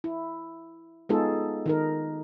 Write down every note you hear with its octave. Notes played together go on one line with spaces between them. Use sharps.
E4
G#3 B3 D#4 F4 G#4 A4
D#3 D#4 A#4